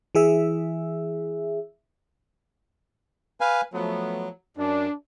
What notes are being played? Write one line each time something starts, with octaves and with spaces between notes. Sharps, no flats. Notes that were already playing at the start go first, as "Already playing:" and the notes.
E3 G#4 E5
B4 F5 G#5
F3 F#3 A3 B3
F#2 D4